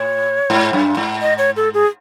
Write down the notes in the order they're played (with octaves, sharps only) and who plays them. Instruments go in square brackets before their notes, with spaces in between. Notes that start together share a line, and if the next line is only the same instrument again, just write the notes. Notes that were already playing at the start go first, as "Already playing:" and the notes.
Already playing: [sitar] A2 [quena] C#5
[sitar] G#2
F#2
G#2
[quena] D#5
C#5
A4
G#4